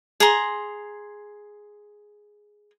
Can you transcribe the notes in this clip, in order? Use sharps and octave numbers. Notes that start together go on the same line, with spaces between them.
G#4 A#5 C6